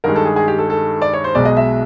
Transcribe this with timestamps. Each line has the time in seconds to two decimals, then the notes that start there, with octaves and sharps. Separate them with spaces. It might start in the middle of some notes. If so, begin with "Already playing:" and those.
0.04 G2 D#3 G#3 A#4
0.16 A4
0.25 G#4
0.36 G#4
0.48 G4
0.58 A4
0.70 A4
1.02 D5
1.13 C#5
1.24 C5
1.35 B1 B2 G#3 D5
1.45 D#5
1.57 E5